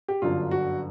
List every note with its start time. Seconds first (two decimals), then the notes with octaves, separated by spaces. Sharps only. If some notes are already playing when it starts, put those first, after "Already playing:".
0.08 G4
0.22 G1 F#2 D3 F4
0.51 F#4